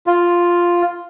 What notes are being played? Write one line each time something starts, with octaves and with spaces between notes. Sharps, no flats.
F4